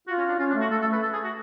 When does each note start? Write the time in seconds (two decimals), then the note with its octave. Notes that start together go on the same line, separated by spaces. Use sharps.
0.07 F4 F#4
0.18 C#4
0.29 D4
0.39 C#4 F4
0.50 D4
0.55 A3
0.61 F#4
0.71 A3 A4
0.82 A4
0.87 A3
0.92 B4
1.03 A4
1.13 G#4
1.24 F#4